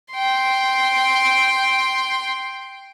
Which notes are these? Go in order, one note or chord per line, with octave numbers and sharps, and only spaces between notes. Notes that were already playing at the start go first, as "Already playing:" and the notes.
G5 C6